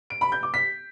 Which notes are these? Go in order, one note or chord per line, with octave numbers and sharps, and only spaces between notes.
D7
B5
G6
D6
B6